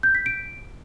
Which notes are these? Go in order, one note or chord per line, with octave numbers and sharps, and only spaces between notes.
G6
B6
D7